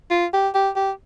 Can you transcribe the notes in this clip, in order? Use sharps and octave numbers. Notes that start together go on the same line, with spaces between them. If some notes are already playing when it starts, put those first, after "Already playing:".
F4
G4
G4
G4